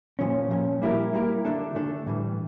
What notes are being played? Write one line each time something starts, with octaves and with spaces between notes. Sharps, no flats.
A#2 F3 C#4
A#2 F3 C#4
G3 A#3 E4 G4 A#4
G3 A#3 E4 G4 A#4
D3 A3 D4 A4
D3 A3 D4 A4
A2 E3 G3